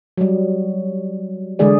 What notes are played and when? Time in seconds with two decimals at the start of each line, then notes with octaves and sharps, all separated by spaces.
0.18 F#3 G3
1.59 D3 E3 G#3 G#4 D5